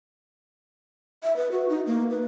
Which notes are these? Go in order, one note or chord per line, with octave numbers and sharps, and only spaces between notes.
E5
B4
F#4
D#4
A#3
B4